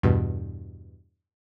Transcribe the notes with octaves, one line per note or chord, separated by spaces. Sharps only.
E2 G2 B2